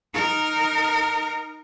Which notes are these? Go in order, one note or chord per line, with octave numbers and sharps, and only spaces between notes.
D#4 A#4